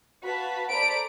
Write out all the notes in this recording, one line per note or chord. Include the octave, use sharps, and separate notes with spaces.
F#4 B4 F5 A5 B5
A4 C5 D5 A#5 B5 D7